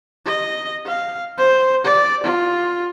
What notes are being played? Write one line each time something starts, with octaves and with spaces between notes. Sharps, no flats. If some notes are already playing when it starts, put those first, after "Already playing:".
D#5
F5
C5
D5
F4